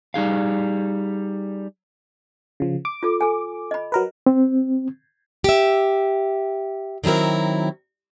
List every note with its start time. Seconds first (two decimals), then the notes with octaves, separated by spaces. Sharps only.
0.14 G3 D#4 G#4 F5
2.60 C#3 F3
2.85 D6
3.03 F4 A4
3.21 A4 G#5
3.71 D#5 B5
3.92 F#3 A#4 B4
4.26 C4
5.44 G4 E5
7.04 D#3 F#3 C4 E4 A#4